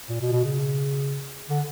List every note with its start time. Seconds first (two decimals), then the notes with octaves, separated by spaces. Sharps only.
0.09 A#2
0.21 B2
0.32 B2
0.44 C#3
1.50 D3